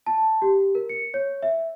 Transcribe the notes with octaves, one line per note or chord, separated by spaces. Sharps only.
A5
G4
A#4
C#7
C#5
E5